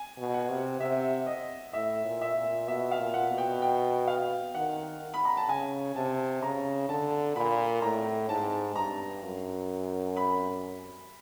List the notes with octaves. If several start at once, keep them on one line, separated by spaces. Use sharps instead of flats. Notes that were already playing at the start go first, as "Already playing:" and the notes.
Already playing: G#5
B2
F#5
C3
C3 E5
D#5
A2 E5
A#2
E5
A#2
B2 E5
F5
A#2
F#5
B2
G5
G5
F5
D#3 F#5
B5
A#5
A5
C#3 G#5
C3 A5
C#3 A#5
D3 A5
A#2 B5
A2 A#5
G#2 A5
G2 A#5
F#2
B5